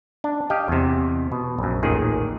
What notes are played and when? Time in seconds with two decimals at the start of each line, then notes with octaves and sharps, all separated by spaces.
0.24 D4
0.50 G4 D#5 F5 G5
0.68 E2 C3
1.32 B2
1.59 A#1 F#2
1.83 A1 D#2 A#2 D#3 G#4